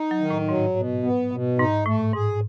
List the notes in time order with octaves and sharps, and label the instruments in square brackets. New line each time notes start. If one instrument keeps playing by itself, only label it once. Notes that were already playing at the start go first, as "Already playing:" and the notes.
Already playing: [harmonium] D#4
[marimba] F#3
[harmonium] D#3
[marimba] A2
[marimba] G#2 [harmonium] F#3
[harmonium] B2
B3
B2
[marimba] G#2 [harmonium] D#4
[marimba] A2 [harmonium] A3
[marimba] G#2 [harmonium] G#4